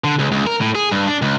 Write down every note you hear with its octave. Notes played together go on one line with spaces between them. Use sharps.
D3
C#2
C#2
A#4
A2
G#4
G2
D4
C#2